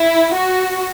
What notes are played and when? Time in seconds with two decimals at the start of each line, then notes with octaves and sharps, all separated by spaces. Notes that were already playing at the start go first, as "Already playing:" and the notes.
Already playing: E4
0.35 F#4